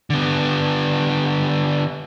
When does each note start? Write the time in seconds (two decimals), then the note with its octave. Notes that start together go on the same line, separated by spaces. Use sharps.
0.10 D3 B3